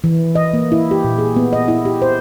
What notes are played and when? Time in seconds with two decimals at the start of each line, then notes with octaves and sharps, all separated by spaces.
0.04 E3
0.35 D#5
0.54 A#3
0.72 E4
0.91 G4
1.04 A#2
1.19 G#4
1.36 B3
1.53 D#5
1.68 E4
1.85 G4
2.02 C5